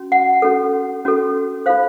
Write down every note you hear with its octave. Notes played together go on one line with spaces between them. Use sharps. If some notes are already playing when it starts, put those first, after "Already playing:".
Already playing: C#4 F#4
F#5
C#4 F#4 A4
C#4 F#4 A4
F4 A4 C5 F5